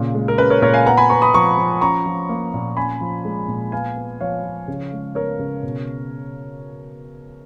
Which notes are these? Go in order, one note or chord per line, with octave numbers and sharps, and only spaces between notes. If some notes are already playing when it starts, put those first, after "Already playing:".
Already playing: A#2 C#3
G#3
A#4
C#4 B4
A#4 C#5
A#2 A#4 C#5
F5 G#5
B3 F#5 A#5
G#5 B5
B3 A#5 C#6
B5 D#6
F3 A#5 C#6
F3
C#4 A#5 C#6
F3
A#3
A#2
C#4 G#5 B5
F3
G#3
A#2
B3 F5 G#5
B3
F3 C#5 F5
F3
C#3
G#3
B3 A#4 C#5
C#3
B2